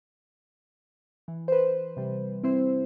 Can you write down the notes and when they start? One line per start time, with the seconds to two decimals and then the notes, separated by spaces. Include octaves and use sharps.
1.28 E3
1.48 B4 C5
1.97 C3 G3
2.44 C4 E4 C5